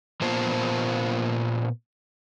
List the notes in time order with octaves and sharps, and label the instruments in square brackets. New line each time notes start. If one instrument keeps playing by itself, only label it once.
[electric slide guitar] A#2 A#3 B3 F4 C5 A5